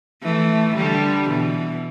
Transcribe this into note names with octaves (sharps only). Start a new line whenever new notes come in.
E3 A3
D3 G3
B2 E3